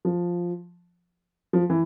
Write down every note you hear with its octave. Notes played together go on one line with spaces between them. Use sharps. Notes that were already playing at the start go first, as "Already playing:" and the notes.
F3
F3
E3